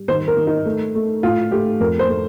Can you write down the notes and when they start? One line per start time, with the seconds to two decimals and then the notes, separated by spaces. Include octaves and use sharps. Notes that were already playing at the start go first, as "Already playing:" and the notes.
Already playing: G3
0.08 D#3 C5
0.28 A#4
0.37 D#3
0.47 D#4
0.65 A3
0.95 A3
1.23 A2 F4
1.51 A3 G4
1.80 F2 A#4
1.99 C5
2.09 A3